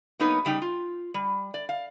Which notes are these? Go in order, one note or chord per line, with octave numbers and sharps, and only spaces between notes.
F#3 A#3 B3 D#4 B4 C#5
C#3 G3 D#4 G5
F4
G3
D5
F5